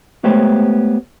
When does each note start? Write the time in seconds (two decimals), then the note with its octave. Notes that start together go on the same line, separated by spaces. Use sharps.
0.24 G#3 A3 B3 G4 C5 C#5